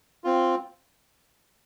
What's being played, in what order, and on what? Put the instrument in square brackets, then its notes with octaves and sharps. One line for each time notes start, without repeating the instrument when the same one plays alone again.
[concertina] C4 F4